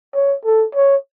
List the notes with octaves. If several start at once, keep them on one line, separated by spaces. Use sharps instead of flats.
C#5
A4
C#5